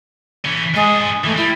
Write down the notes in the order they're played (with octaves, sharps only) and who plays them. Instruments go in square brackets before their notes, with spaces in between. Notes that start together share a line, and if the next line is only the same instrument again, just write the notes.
[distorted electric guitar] E3 C#4
[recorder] G#3 [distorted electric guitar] D4 G#4
[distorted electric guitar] E3 G#3 [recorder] A3
[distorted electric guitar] G3 [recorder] E4